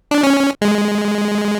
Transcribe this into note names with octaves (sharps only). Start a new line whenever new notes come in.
D4
C#4
G#3